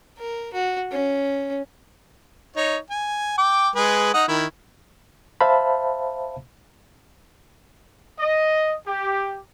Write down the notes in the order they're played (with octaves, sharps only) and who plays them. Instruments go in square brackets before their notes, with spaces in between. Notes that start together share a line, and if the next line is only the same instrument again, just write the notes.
[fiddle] A#4
F#4
C#4
[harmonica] D#4 C#5
G#5
G5 D6
G#3 G#4 B4
D#4 F#5 D#6
D#3 E4
[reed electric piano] C5 E5 F5 A5 B5
[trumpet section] D#5
G4